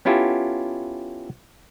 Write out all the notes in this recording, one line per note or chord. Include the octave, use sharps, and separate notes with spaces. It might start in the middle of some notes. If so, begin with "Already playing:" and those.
B3 C#4 E4 F4 G4 A4